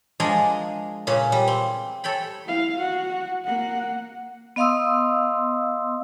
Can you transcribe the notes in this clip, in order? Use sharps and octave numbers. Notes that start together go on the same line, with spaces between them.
F3 G#3 D4 A#4 G#5 A#5
A#2 C#3 C#4
G3
C4
A4 C#5 G5 B5
E4 F5
F#4 F#5
A#3 F#5
B3 D#5 F5 C6 D#6 E6